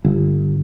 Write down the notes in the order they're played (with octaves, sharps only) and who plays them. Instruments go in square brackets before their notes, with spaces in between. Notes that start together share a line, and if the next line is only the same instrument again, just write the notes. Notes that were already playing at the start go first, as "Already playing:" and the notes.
[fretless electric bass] G1